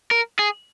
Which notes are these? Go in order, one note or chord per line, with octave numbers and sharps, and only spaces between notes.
A#4
G#4